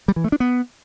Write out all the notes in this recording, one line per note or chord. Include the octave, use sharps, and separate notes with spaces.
G3
E3
A3
D4
B3